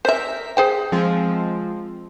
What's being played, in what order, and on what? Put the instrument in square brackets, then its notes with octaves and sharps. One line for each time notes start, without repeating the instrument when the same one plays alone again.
[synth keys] A#4 B6 [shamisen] C5 E5
[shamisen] G#4 C5 G5
[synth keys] F3 G#3 C4